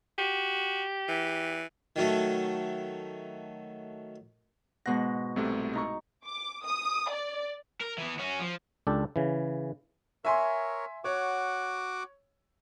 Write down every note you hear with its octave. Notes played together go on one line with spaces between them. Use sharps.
F#4 G4
E3
D#3 F#3 A3
G#2 B2 F#5 A#6
C2 C3 A3
D#4 A#5 C#6
D6
D#6
D5
A#4
E3 B3
C#4 F#4
F3
C#2 D4 G4 A4
C#3 E3
A#4 C#5 E5 G#5 C6
F#4 C#5 F#5 D6